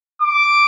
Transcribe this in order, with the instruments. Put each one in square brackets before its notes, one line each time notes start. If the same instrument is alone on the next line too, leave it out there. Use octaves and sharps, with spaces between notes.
[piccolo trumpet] D6